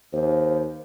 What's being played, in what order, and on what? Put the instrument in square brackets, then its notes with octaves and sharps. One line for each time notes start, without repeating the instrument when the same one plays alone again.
[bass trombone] D#2 [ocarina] C5